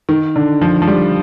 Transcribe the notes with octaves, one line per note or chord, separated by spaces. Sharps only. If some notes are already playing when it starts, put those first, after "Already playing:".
D#3
D3
F3
F3
G3